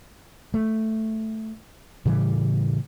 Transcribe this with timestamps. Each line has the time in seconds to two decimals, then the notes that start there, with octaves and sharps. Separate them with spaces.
0.54 A3
2.05 A2 C#3 E3 G3